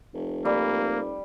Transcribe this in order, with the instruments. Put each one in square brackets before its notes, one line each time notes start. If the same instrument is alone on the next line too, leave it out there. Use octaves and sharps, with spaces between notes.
[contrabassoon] F1
[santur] G3 [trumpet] A#3